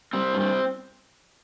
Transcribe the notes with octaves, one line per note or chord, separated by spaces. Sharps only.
G3 C4
G2
C4